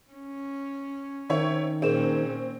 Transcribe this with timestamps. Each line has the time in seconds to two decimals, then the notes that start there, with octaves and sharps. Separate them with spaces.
0.12 C#4
1.29 D#3 C4 C#5 E5
1.82 A#2 C4 C#4 G#4 A#4 E7